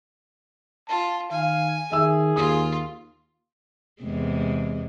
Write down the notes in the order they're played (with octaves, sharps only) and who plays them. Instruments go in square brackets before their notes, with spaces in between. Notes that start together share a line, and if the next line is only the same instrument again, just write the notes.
[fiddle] F4 [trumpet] A5
[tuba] D#3 [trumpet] F5 [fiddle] G#5
[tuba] D#3 [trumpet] G#4 [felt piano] E5 E6
[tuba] D#2 [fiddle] F4 [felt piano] D#6
[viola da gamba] E2 C3 G#3